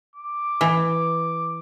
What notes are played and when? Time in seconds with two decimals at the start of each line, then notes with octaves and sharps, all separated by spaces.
0.16 D6
0.61 E3